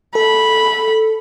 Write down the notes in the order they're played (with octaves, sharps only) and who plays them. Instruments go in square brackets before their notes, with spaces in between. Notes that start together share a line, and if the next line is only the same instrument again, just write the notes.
[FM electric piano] A4 [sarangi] B5